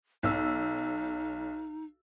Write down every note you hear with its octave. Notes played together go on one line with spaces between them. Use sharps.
B1 D#4 E6